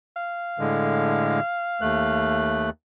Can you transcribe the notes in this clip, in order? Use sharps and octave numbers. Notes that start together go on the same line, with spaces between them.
F5
A2 D3 G#3
D#2 A3 F#6